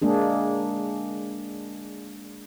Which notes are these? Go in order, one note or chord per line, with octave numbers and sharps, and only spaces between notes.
G#3 A#3 D4 G#4